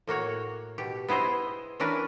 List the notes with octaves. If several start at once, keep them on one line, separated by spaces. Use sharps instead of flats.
A2 A#3 F#4 C#5
B2 G4
B3 E4 G#4 C5 D#5
E3 C#4 D4 A#4 B4